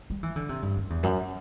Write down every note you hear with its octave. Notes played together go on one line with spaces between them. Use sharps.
G3
E3
D3
C3
G2
F#2
E2
F#2